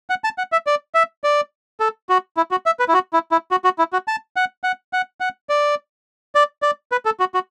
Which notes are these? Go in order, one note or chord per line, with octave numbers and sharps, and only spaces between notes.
F#5
A5
F#5
E5
D5
E5
D5
A4
F#4
E4
F#4
E5
B4
E4
F#4
E4
E4
F#4
F#4
E4
F#4
A5
F#5
F#5
F#5
F#5
D5
D5
D5
B4
A4
F#4
F#4